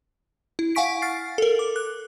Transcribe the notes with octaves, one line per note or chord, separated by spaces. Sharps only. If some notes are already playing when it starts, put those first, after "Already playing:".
E4
F5 F#5 G#5 C#6 B6 D7
F6 A6 C7
A4 A#4
D6
F#6